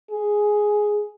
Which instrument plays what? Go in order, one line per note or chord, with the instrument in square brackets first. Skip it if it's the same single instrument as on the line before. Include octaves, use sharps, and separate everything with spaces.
[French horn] G#4